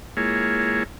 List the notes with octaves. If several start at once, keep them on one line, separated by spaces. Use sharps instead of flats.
G#3 A#3 E4 F4 G#4 C#5